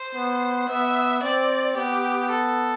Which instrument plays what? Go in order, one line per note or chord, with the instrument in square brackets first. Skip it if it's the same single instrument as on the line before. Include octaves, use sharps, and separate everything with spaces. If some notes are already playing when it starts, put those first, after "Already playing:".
Already playing: [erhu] C5
[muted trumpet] B3
[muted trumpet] B3 [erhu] E5
[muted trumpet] C4 [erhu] D5
[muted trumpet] B3 [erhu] G4
[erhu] A4